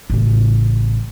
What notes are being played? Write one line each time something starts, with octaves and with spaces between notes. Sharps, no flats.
A1 C#3